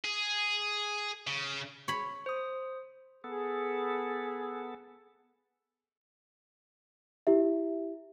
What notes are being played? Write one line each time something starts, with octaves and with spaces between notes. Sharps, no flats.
G#4
C#3
C#5 B5
C5 D#6
B3 G#4 A4
E4 G4 E5